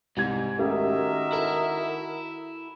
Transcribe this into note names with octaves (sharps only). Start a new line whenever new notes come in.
C2 G#2 G#6
D#3 A3 C#4 F#4 G4 A#4 D#5 E5
E4 A4